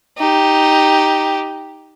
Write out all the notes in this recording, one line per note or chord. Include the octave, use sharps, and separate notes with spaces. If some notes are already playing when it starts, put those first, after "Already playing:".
D#4 G4